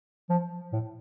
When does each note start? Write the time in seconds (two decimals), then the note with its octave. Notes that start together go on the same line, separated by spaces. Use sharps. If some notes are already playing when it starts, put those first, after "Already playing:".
0.29 F3
0.72 A2